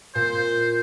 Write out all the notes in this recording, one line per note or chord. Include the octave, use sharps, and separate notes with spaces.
A#2 C5